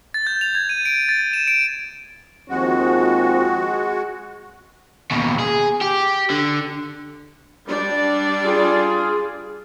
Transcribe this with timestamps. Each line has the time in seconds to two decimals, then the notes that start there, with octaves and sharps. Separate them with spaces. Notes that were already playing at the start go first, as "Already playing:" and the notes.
0.14 A6
0.27 G6
0.41 F7
0.55 G#6
0.69 D#7
0.85 D7
1.09 A6
1.33 E7
1.48 D7
2.49 D#2 F3 G#3 C4 F#4
5.11 D#2 B2
5.39 G#4
5.81 G4
6.30 D3
7.67 G3 D4 D5
8.45 F4 G#4